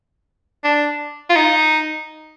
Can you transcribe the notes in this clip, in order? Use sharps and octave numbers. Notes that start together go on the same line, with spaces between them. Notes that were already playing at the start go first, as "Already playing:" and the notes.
D4
F4
D#4